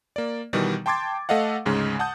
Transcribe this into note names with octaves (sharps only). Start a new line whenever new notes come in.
A#3 D5
B2 D#3 E3 G3
G5 A5 C6 D6 G#6 A6
A3 A4 D#5 F5 F#5
D2 G#2 C#3 G#3
F#5 A5 D#6 G6